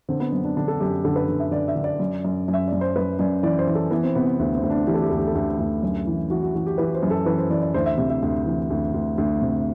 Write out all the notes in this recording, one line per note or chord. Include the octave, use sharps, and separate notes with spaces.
D3 C4
B3
F#2 C4
D4
D3 D4
A4
F#2 G4
D3 A4
B4
D3
E5
D3 D5
E5
D3
D5
F#2
F#2
F#2
E5
F#2 D5
C5
F#2 B4
F#2 D5
E3 D5
C5
E3
A4
E3 B3
C4
C3 B3
D2 C4
C4
D2
D4
E3 G4
A4
G4
D2 A4
G4
A4
D2 G4
D2
F#2
E3
E3 F#4
F#4
E3 F#4
G4
E3 B4
C5
F#2
A4
E3 B4
C5
E3 D5
D5
D2 C5
E5
C3 E5
E5
D2 E5
E3
D2
D2
D2
C3